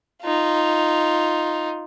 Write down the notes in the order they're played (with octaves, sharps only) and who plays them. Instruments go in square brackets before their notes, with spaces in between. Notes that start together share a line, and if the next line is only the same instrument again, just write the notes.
[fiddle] D#4 F4